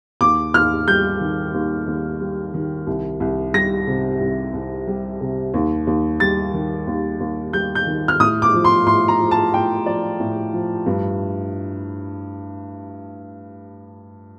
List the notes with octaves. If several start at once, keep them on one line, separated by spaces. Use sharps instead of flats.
D#2 D6
D#2 F6
G3 G6
D#3
D#2
D#2
G3
D#3
C2
C2
G3 A#6
C3
C2
C2
G3
C3
D#2
D#2
G3 A6
D#3
D#2
D#2
G3 G6
G6
D#3
F6
A2 D#6
D6
F3
C6
A2 C6
A#5
F3
A5
A2 G5
F3 D5
A2
F3
G2